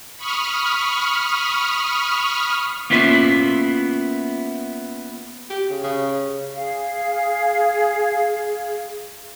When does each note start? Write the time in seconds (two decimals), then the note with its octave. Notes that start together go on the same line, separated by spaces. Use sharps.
0.17 B5 C#6 D#6 F6
2.90 A#3 B3 C#4 E4 F4 E5
5.50 G4
5.70 C#3
5.84 C#3
6.56 G#4 F5